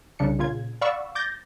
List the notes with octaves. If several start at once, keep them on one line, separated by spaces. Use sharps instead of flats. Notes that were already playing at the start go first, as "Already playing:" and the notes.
C2 C#3 D4 C#7
A#2 C#3 F4 G#6
D5 F5 F#5 B5 C#6 E6
D6 G6 A6 A#6